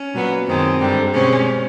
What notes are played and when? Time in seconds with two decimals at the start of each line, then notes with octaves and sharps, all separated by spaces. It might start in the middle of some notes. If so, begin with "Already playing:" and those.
Already playing: C#4
0.14 A#2 F#3 B3
0.47 F#2 D#3 G#3 C4
0.80 G2 D3 G3
1.13 B2 G#3 C4 C#4